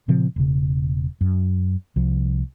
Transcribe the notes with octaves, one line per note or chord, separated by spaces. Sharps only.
A#2 C#3 F3 C4
E1 C#3
F#2
C2 F3